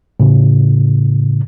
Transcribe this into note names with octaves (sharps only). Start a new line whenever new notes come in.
A2 C#3